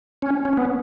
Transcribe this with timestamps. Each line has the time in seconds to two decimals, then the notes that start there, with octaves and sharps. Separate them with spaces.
0.22 C#4
0.45 C#4
0.57 B3